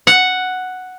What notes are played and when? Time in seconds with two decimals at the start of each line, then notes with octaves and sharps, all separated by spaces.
0.07 F#5